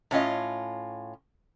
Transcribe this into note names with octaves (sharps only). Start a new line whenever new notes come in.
A2 C#4 F4 D#5